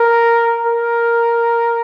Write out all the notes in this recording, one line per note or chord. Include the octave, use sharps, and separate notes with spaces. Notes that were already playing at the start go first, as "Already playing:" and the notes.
Already playing: A#4
A#4